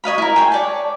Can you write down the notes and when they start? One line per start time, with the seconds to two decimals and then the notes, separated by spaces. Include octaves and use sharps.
0.04 C#5 D#5 F5 B5
0.18 E4 A#4
0.36 G#4 G5
0.52 C#5 D5 A5